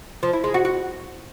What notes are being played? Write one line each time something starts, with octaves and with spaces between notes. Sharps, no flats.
F3
E4
G#3
F#4
F#4